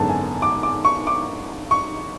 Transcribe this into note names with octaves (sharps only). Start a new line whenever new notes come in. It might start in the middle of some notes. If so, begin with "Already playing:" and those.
Already playing: G#1 F#2 D3 G#3 B3 A5
G#5
D6
D6
C#6
D6
C#6